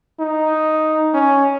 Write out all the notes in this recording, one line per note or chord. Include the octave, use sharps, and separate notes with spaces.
D#4
C#4